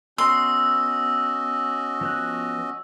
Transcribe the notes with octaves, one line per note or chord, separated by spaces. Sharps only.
B3 C#4 F#4 D#5 C6 E6
F3 B3 F#6